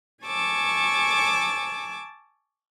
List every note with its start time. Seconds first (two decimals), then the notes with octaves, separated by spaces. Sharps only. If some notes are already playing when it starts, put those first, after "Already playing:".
0.25 G#5 A5 C#6 D6 E6